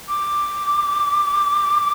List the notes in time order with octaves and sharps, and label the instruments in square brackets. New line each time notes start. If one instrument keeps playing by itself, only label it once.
[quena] D6